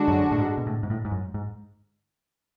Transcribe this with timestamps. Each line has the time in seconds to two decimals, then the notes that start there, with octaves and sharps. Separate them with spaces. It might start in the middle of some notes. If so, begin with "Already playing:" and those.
Already playing: D3 G#3 D4 F#4
0.08 F#2
0.31 A2
0.38 G#2
0.57 B2
0.67 A2
0.83 G#2
0.90 A2
1.05 G#2
1.12 F#2
1.34 G#2